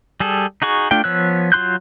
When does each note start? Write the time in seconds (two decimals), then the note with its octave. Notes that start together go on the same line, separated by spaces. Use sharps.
0.20 G3 G#4 A4
0.62 D#4 F#4 G#4 C#6
0.91 A3 D4 F4 G5
1.04 F3 B3 C#5 E6 F#6
1.52 F#3 F4 C6 F#6 G6